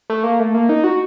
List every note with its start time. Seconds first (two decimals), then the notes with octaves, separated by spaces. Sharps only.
0.10 A3
0.24 A#3
0.40 A3
0.55 A#3
0.69 D#4
0.84 F#4